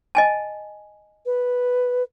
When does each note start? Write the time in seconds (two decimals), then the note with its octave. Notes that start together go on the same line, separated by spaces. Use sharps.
0.15 D#5 G#5 A5
1.26 B4